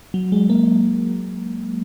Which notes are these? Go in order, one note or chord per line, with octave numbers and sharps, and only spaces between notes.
F#3
G#3
A#3